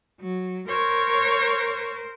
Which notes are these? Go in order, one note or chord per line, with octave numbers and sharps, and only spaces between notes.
F#3
A#4 C5 C#5